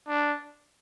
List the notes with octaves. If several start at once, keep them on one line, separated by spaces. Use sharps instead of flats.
D4